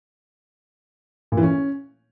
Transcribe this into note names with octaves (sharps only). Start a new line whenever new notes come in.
A#2
E3
C#4